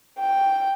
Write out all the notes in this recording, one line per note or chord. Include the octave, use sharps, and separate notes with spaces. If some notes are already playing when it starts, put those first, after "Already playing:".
G5